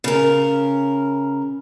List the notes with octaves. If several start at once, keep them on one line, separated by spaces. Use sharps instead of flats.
C#3 A#4